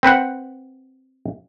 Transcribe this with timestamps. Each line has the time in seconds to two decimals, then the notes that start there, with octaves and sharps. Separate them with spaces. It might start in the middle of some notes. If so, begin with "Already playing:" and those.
0.03 C4 B4 C5 F#5